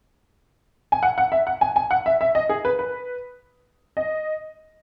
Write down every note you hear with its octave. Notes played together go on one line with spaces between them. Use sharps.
G#5
F#5
F#5
E5
F#5
G#5
G#5
F#5
E5
E5
D#5
G#4
B4
B4
D#5